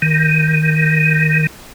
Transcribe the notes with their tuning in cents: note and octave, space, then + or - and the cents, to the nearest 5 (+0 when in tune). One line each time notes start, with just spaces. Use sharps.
D#3 +5